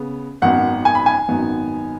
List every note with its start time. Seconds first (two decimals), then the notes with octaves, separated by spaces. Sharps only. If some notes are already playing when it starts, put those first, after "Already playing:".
Already playing: C#3 B3
0.42 G#1 F#2 D#3 B3 D#4 F#5
0.85 G#5
0.95 B5
1.06 G#5
1.28 G#1 F#2 D#3 B3 D#4